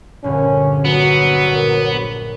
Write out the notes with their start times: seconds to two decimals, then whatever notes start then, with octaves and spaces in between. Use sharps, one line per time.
0.24 A#1 G2 D3 C#4
0.85 F#3 B3
1.46 A#1 A#3 C#5